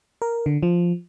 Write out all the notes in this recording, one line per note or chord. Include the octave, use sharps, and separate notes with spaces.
A#4
D3
F3